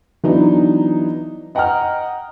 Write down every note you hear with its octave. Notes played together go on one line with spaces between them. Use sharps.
E3 F#3 B3 D4 D#4
D#5 F#5 G5 A#5 D#6 F6